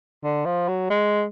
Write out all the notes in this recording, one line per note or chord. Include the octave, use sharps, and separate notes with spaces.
D3
F3
F#3
G#3